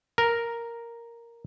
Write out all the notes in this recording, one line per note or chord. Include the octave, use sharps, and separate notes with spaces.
A#4